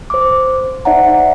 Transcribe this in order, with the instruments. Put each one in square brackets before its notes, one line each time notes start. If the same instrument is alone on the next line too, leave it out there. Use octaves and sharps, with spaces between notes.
[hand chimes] C5 D6
D#4 C5 D5 E5 F#5 A#5